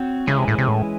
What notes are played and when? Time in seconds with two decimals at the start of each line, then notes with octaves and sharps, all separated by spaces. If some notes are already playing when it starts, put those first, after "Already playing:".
Already playing: C4 F#4 C#5
0.27 C#3 E3 G#3 C#4 E4
0.38 C3
0.48 A2
0.58 C3
0.68 A2